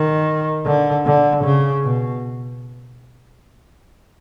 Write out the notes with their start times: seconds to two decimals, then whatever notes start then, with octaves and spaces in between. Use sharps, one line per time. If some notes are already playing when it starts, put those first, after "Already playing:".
Already playing: D#3
0.66 D3
1.05 D3
1.44 C#3
1.84 B2